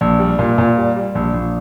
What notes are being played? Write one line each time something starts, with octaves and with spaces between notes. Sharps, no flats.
A#1
G3
A#2
A#2
G3
G3
A#1
A#1